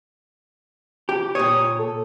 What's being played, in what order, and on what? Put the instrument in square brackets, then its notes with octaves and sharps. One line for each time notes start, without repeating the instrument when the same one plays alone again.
[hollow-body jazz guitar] G4
[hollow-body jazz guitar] A#2 C#5 [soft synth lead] D#6
[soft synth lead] A4